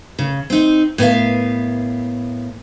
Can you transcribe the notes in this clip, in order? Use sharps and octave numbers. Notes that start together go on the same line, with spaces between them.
C#3
C4 D#4
A2 B3 A#4 F5